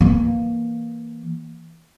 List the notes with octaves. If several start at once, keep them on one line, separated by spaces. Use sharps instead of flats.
E3 A#3